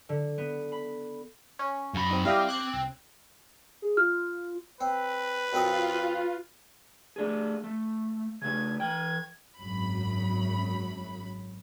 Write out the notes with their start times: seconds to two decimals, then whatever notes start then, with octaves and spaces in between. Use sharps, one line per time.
0.09 D3
0.38 B3
0.72 B5
1.59 C#4
1.94 F#2 B5
2.11 C4 D#4
2.25 G3 C4 E4 G4 D#5 F5
2.49 D6 F#6 G#6
2.74 C2
3.82 G#4
3.97 F4 F6
4.81 C4 B4
5.53 F#2 C4 F4 D#5
7.16 A3 D4 G#4
7.64 A3
8.42 C#3 A3 G#6
8.80 E3 G5 G#6
9.58 G#1 F#2 F#3 B5